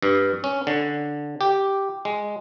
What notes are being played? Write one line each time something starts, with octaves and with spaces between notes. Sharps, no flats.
G2
C#4
D3
G4
G#3